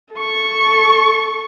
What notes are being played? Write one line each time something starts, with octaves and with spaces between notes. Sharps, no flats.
A4 C#6